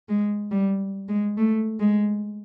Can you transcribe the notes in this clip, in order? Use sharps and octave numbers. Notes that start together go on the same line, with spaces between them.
G#3
G3
G#3
A3
G#3